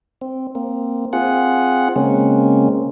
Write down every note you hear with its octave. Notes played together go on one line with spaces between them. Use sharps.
C4
A#3 C4
C4 F4 G#4 F#5
C#3 G#3 A#3 C4 C#4